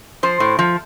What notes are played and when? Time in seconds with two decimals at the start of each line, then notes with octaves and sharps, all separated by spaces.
0.23 F3 C5
0.40 A2
0.59 F3